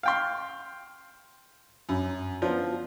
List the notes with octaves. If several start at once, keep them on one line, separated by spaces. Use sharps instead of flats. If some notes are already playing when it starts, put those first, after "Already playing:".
F5 G5 C6
F#2
F3 B3 D4